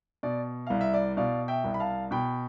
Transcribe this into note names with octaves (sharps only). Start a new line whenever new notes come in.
B2 D5
C2 F5
E5
D5
B2 D5 F5
E5 G5
C2
B5
F5 A5
B2 G5 B5